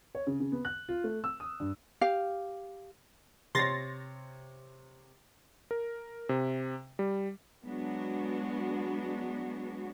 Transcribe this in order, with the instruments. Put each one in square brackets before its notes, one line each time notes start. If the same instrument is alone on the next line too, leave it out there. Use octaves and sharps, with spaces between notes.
[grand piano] C#5
C#3
C#3
B3
F#6
F4
A3
E6
D#6
G2
[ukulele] G4 F5
[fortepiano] C3 C#5 [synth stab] C6 A6 A#6
[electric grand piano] A#4
C3
G3
[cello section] F#3 G#3 B3 D4 F#4